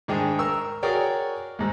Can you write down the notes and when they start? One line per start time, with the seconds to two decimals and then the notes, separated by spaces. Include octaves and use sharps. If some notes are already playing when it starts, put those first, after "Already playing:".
0.08 G#2 D#3 D4 G#4 G5 D#6
0.39 A#4 C#6 E6
0.83 F#4 G#4 A#4 C#5 D5 G5
1.59 D#2 G#2